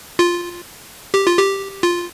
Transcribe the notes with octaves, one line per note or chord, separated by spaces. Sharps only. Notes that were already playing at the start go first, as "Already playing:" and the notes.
F4
G4
F4
G4
F4